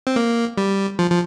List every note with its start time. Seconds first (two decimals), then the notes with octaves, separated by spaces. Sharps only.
0.07 C4
0.16 A#3
0.58 G3
0.99 F3
1.10 F3